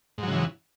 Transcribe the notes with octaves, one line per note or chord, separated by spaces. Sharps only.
G#2 C#3 E3 F#3